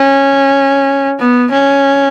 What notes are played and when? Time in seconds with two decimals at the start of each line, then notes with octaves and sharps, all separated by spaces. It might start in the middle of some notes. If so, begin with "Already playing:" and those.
Already playing: C#4
1.19 B3
1.51 C#4